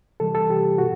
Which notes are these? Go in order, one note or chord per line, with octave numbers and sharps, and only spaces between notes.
C3 E3 G3 A4
A4
C3 E3 G3 G4
B2 F#4